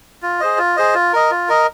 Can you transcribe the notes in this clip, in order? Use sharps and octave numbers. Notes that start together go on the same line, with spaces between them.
F4
G#4 C5 D#5
F4
G#4 C5 D#5
F4
A#4 D#5
F4
A#4 D#5